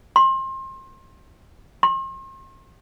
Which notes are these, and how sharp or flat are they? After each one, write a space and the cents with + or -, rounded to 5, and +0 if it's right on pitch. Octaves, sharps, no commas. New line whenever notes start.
C6 +30
C6 +40